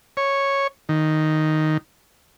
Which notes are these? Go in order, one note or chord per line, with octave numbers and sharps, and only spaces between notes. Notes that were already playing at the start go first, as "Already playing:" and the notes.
C#5
D#3